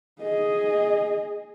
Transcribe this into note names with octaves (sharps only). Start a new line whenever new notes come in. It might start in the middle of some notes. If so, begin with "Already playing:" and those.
G#4 D#5